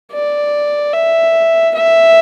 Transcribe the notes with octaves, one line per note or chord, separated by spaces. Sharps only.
D5
E5
E5